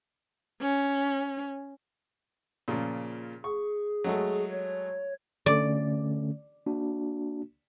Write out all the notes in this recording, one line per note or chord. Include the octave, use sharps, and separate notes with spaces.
C#4
A#2 C#3 F3
G#4 C#6
F#3 G#3 A3
C#5
D3 A3 C#4 D5
A#3 D4 F#4